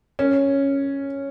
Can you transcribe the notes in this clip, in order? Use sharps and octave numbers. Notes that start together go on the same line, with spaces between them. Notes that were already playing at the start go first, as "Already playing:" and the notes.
C#4